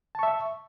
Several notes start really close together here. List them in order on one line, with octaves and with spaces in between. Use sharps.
A5 C#6 E5